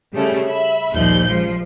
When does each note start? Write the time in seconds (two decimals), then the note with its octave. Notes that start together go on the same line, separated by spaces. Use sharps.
0.14 C#3 G3 A3 C#4
0.47 E5 B5
0.93 A#1 D#2 F3 G3 F#6 G6
1.26 C#2 F3